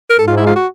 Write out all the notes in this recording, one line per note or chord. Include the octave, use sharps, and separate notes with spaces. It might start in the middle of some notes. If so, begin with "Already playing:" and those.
A#4
G#2 A4
F4
E4
F4
F#4